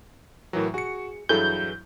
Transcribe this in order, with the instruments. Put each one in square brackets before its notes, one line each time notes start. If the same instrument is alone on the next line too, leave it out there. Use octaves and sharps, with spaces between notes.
[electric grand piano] A2 E3 F#3 [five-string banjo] A#4
[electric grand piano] F#4 C#7 [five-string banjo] G#4
[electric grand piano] G2 F#3 E4 [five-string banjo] E3 G#4 A4 [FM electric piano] G6